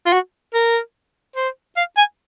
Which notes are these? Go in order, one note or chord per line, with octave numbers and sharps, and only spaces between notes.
F4
F#4
A#4
C5
F5
G#5